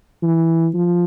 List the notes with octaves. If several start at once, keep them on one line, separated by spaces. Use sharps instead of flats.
E3
F3